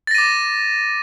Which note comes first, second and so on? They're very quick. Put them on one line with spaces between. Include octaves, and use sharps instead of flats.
A6 A#6 D#7 D6